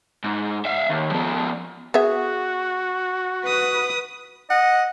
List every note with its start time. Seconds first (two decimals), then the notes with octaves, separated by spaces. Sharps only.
0.24 G#2
0.66 E5 F5
0.90 D#2
1.12 F3 B3
1.94 B3 F#4 G#4 E5
3.44 B4 D#6
4.50 D#5 F#5